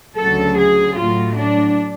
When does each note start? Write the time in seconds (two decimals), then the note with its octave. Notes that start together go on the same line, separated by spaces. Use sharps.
0.17 D2 C#3 F#3 A4
0.57 G#4
0.96 A2 F#3 A3 F4
1.36 D4